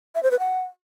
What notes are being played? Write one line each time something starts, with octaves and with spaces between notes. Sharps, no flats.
E5
C5
B4
F#5